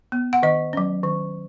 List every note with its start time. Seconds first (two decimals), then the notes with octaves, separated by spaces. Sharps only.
0.12 B3
0.33 F#5
0.43 D#3 D#5
0.73 F#3 C#4
1.03 D#3